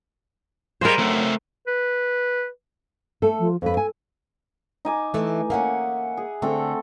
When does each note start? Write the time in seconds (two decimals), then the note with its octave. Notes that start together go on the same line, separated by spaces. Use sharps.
0.81 G3 G#3 A#3 A#4 C5
0.99 F#2 A3 C4
1.67 B4
3.22 A3 A4
3.39 F3
3.62 F2 A4 B4
3.77 G#5
4.85 D#4 G#5 D6
5.14 E3 A3
5.50 A#3 C#4 E5 F#5 G#5
6.17 G#4
6.42 D3 A3 C4 A4